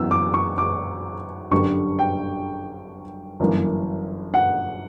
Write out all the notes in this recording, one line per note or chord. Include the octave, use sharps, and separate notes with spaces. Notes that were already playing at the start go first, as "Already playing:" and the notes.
Already playing: F#2 E3 B3 E6
D6
C#6
D6
G1 F#2 D3 G3 C#6
G5
G1 F#2 E3 A#3
F#5